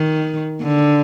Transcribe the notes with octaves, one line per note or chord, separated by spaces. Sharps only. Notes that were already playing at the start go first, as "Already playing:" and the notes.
Already playing: D#3
D3